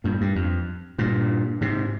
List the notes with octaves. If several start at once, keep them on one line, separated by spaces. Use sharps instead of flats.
G2 A#2
G2
F2
G2 A#2
G#2 C3